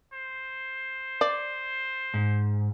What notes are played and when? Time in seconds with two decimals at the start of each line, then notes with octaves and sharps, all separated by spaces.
0.13 C5
1.21 D5
2.14 G#2